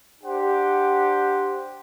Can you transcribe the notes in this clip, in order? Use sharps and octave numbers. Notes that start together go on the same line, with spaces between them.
D4 G4 C5 F#5